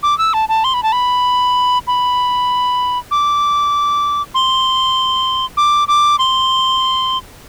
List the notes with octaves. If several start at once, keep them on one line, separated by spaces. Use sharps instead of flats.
D6
E6
A5
A5
C6
B5
A5
B5
B5
D6
C6
D6
D6
C6